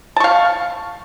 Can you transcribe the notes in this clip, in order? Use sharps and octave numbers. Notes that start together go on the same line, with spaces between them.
F5 A5 C#6